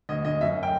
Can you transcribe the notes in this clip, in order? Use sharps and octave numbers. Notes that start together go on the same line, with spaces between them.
D2 D#5
D2 D#5
F#2 E5
G5